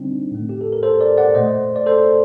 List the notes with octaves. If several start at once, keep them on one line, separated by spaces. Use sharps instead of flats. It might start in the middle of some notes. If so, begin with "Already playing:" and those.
Already playing: D3 G3 C4 D4 D#4
A2 A3
G4
A4
A#4
A4 C5
A#4 D5
D5 F#5
A#2 A3 C5 D#5
D5
A4 C5